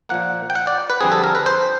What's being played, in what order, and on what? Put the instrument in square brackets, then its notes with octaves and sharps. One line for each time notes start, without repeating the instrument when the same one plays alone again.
[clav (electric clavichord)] A#2 F3 A#3 F#5
G5
F#5
D5
B4
F2 D3 G3 C4 G#4
A4
A#4
B4
C5